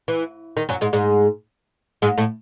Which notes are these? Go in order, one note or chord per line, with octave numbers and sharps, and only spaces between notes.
E3
D#3
F#2 F#3
G#2 G#3
G#2 G#3
G#2 G#3
A2 A3